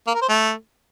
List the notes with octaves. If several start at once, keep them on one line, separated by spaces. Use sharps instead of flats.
A#3
A#4
C5
A3